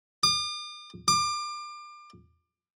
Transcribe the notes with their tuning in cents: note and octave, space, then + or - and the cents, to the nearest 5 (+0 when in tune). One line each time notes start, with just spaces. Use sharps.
D6 +45
D6 +30